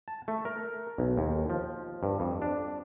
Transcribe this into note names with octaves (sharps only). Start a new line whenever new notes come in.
A5
A3
A#4
B1
D#2
F3
G2
F2
D4